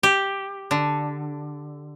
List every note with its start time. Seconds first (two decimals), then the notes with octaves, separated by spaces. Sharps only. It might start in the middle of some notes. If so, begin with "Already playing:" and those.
0.03 G4
0.71 D3